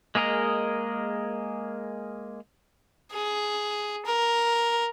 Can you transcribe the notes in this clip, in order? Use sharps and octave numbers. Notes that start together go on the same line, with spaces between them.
G#3 A#3 G#4 A#4 D#5
G#4
A#4